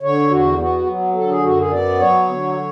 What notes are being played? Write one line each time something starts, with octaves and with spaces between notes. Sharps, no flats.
D3 C#5
E2 F#4
B3 F#4
F#3
D3 A4
G#4
F#2 F#4
G#4
B3 D5
F#3 C#5
D3